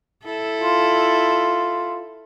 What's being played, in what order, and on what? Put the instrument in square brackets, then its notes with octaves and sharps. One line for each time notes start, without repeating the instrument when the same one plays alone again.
[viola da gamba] E4 A4
[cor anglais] F4